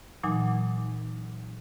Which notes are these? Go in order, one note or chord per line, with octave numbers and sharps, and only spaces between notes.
A#2 E3 F#3 D#4 G#5